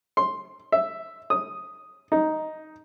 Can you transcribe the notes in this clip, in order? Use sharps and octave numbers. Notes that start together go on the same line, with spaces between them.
C6
E5
D#6
D#4